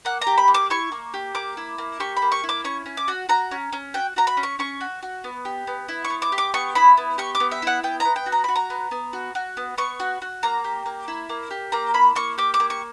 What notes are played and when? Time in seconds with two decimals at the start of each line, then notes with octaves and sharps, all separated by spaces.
0.05 A#3 F#5
0.21 A#5
0.27 G4
0.38 B5
0.48 A#3
0.54 D6
0.70 E4 C#6
0.92 A#3
1.14 G4
1.35 A#3 D6
1.57 E4
1.78 A#3
2.00 G4 C#6
2.17 B5
2.22 A#3
2.32 C#6
2.44 E4
2.49 D6
2.64 C#4 C#6
2.86 C#4
2.97 D6
3.08 F#4
3.29 F#4 A#5
3.51 C#4
3.73 C#4
3.94 F#4 G5
4.16 F#4 A#5
4.27 B5
4.37 C#4
4.43 C#6
4.59 C#4 C#6
4.81 F#4
5.03 F#4
5.24 B3
5.45 G4
5.67 B3
5.88 E4
6.05 C#6
6.10 B3
6.22 D6
6.32 G4
6.38 D6
6.54 B3 C#6
6.75 E4 B5
6.97 B3
7.18 G4 C#6
7.35 D6
7.40 B3
7.51 E5
7.62 E4 F#5
7.83 B3 G5
8.00 B3 A#5
8.16 G5
8.26 F#4
8.32 A#5
8.44 F#4 B5
8.56 A#5
8.70 B3
8.91 B3
9.13 F#4
9.35 F#4
9.57 B3
9.78 B3 C#6
10.00 F#4
10.22 F#4
10.43 A#3 A#5
10.64 G4
10.86 A#3
11.08 E4
11.29 A#3
11.51 G4
11.72 A#3 A#5
11.94 E4 B5
12.15 A#3 C#6
12.38 G4 D6
12.54 D6
12.60 A#3
12.70 C#6